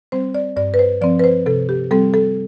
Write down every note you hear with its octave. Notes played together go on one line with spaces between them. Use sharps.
G3 C4 C5
D5
G2 D5
B4
C5
F3 C4 D5
B4
C5
C3 A4
G4
G3 C4 A4
A4